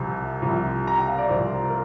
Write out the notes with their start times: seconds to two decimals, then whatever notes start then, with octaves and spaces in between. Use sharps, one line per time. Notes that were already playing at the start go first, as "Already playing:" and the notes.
Already playing: C2 C3 F3
0.42 C2 C3 F3
0.87 A#5
0.98 G5
1.08 F5
1.18 D5
1.29 C2 C3 F3 C5
1.69 A#4